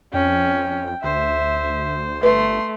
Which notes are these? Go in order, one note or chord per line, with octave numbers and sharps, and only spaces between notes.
F2 C#4 G5
D2 C5 E5
G1 A3 B4 C6